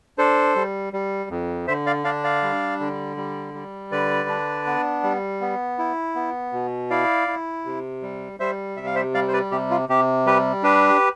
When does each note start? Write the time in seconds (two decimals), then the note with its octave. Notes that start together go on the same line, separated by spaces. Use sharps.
0.18 D4 A4 C5
0.56 G3
0.93 G3
1.30 F2
1.68 D3 C5 E5
1.86 D5 F5
2.04 D4 D5 F5
2.24 D5 F5
2.43 G3
2.80 D3
3.17 G3
3.54 G3
3.92 D3 B4 D5
4.29 D4
4.66 B3
5.03 G3
5.41 B3
5.79 E4
6.15 B3
6.53 B2
6.90 E4 D5 F5
7.28 E4
7.65 C3
8.02 G3
8.40 G3 C5 E5
8.77 C3 E5
8.86 F5
8.95 C5 E5
9.14 G3 D5 F5
9.28 C5
9.33 B4 D5
9.51 C3 G4
9.71 F4
9.89 C3 G4
10.26 G3 G4 B4
10.63 D4 G4 B4